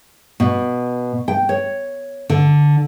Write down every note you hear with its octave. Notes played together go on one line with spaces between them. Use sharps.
B2
G5
C#5
D3